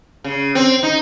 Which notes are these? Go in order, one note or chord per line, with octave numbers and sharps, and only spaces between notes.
C#3
C4
D#4